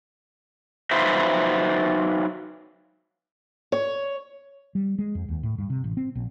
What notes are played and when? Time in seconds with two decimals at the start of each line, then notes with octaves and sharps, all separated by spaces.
0.91 F#3 D#4 F4 B4 C5 E5
3.72 C#5
4.75 G3
4.99 G#3
5.15 F2
5.28 D#2
5.43 A2
5.58 G2
5.70 C3
5.84 A1
5.97 C4
6.15 A#1